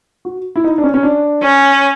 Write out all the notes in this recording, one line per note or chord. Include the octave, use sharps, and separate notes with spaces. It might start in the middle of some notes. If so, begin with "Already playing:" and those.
F#4
E4
D#4
D4
C#4
C#4
D4
C#4